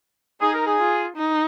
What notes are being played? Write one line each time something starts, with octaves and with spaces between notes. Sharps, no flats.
D#4 G#4
A#4
G#4
F4
D#4